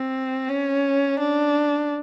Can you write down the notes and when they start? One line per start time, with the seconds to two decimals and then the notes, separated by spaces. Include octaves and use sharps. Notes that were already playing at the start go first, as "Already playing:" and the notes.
Already playing: C4
0.49 C#4
1.20 D4